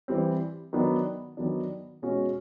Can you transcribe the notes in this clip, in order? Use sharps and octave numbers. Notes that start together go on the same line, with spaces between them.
E3 G3 C4
D#3 F#3 B3 D4
D#3 F#3 B3 D4
B2 G#3 C#4 F#4